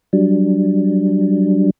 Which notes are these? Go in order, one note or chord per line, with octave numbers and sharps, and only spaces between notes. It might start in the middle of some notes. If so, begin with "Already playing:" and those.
F#3 G3 D4